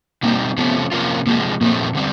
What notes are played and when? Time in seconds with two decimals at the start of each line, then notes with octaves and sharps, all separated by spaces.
0.23 B2 G3 A#3 C4 D#4
0.57 C3 F3 A3 B3 C#4
0.92 C3 F3 A#3 C#4 F4
1.27 C3 F3 G#3 A#3
1.61 A#2 F3 A3 A#3 C4
1.95 D3 G3 C4